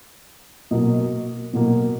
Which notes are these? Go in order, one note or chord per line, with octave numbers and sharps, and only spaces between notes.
B2 F#3 A#3 D#5
B2 F#3 A#3